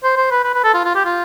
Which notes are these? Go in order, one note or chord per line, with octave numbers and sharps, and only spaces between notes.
C5
C5
B4
B4
B4
A4
F4
F4
G4
F4